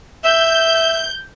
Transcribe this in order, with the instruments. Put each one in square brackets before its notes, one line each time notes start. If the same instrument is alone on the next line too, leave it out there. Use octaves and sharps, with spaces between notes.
[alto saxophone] E5 [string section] G6